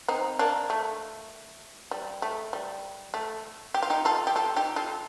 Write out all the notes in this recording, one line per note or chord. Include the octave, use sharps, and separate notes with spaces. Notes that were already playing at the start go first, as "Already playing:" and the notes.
C4 D#4
A#3 D4
A3
G3
A3
G3
A3
G4
F4
D#4 G4
F4 A4
G4
F4 A4
D#4 G4
F4 A4